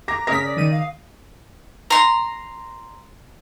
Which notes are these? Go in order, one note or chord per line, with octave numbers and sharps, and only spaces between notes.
A#5 D6 A#6
C#3 A#4 D#6 A#6 B6
D5
D#3 D#7
F5
A#5 C6